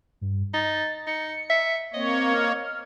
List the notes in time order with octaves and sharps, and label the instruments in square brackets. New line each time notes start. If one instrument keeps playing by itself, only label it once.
[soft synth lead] G2
[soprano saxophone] D#4 [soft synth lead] A6
[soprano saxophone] D#4 [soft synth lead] C#7
[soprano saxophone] E5
[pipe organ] A#3 C#5 [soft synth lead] C4 [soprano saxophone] D#5
[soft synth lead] F6